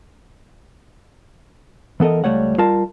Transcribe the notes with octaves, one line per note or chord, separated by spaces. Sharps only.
E3 B3 A4 A#4 D#5
C#2 G3 A3 C#5 F#5
G3 F4 A#4 A5